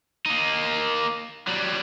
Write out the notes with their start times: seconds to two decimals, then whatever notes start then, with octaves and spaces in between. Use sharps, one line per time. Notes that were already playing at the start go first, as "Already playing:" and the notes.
0.26 A#3 D#4
1.47 F#3 G3